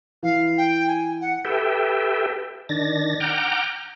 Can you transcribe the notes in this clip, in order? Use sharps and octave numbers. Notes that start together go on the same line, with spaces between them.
E3 F5
G5
G#5
F#5
G4 A4 B4 E5 G5
D#3 D4 A6 A#6
F#5 G5 A#5 D6 F6 G6